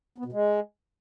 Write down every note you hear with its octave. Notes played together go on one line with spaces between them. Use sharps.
B3
B2
G#3